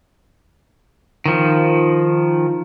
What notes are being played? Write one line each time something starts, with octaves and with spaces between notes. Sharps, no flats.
D#3 F3